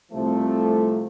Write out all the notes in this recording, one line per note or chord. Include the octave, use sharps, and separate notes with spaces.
C2 C3 F3 A3